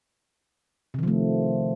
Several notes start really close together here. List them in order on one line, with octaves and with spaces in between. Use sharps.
C3 D#3 F3 A3